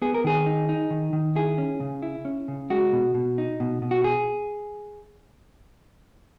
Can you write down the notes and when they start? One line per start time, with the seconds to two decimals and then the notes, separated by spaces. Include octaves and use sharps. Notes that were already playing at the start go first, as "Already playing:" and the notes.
0.02 B3 G#4
0.14 A#4
0.24 D#3 G#4
0.46 D#4
0.69 D#4
0.90 D#3
1.13 D#3
1.36 E4 G#4
1.58 C#4
1.80 C#3
2.02 E4
2.25 C#4
2.48 C#3
2.70 G#3 F#4
2.93 B2
3.14 B2
3.38 D#4
3.60 B2
3.82 B2
3.91 F#4
4.04 G#4